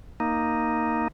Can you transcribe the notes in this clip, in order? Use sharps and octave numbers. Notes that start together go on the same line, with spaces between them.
A#3 D#4